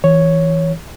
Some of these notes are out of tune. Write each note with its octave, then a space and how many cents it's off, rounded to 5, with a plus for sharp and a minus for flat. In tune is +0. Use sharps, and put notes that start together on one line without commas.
E3 -10 C#5 +0